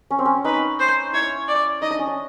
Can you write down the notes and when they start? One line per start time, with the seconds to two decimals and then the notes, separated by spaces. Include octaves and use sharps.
0.10 C#4
0.19 C4
0.25 C#4
0.44 D#4 B4
0.80 C5
1.13 E4 C#5
1.48 D5
1.82 D#4 D#5
1.90 D4
1.99 C#4
2.07 D4